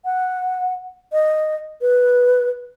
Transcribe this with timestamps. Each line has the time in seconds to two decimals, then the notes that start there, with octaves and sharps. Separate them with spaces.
0.05 F#5
1.12 D#5
1.81 B4